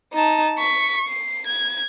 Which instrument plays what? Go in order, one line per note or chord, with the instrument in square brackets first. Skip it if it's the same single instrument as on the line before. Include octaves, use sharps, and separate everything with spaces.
[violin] D#4 A5
C#6 B6
C7
G#6